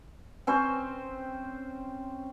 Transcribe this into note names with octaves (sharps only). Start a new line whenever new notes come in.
C4 C#4 C5